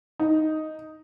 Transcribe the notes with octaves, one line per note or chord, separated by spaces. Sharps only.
D#4